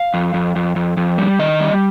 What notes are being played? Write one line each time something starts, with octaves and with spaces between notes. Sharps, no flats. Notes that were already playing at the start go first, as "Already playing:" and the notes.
Already playing: F5
F2
F2
F2
F2
F2
G3
D#3 D#5
G3